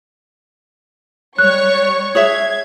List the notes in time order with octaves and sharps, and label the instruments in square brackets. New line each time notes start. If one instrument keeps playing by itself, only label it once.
[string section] G3 C#5 C#6 [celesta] F#6
[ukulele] G#4 C#5 E5 [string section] G#6